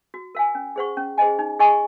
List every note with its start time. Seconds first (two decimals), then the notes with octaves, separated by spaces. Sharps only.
0.14 F#4
0.35 A#4 F5 G#5
0.55 C#4
0.76 G#4 C5 F#5 C#6
0.97 C#4
1.18 G#4 C5 D#5 G#5
1.39 D#4
1.59 G#4 D#5 G#5 C#6